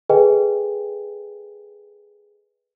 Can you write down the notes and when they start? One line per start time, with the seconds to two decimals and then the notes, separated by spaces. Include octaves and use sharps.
0.09 G#4 A4 B4 D#5 G5 G#5